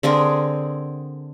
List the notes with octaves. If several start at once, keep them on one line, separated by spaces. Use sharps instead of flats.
D3 C4 G#4 A#4